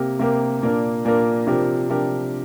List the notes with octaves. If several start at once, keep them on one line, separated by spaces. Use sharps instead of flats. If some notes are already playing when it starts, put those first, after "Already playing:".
Already playing: C3 A#3 G4 A#4
C3 A#3 G4 A#4
A#2 A#3 D4 A#4
A#2 A#3 D4 A#4
C3 F3 D4 G4 A#4
C3 F3 D4 G4 A#4